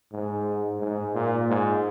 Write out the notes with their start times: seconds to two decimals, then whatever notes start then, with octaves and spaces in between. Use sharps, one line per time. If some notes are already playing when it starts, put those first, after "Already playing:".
0.13 G#2
0.80 G#2
1.15 A#2
1.49 G#2